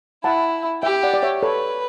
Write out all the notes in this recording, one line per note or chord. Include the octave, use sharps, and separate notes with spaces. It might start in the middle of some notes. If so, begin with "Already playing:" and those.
E4 F#5 A5
G4 E5 G5
D5 F#5
D5
C#5 E5
A4 B4 C#5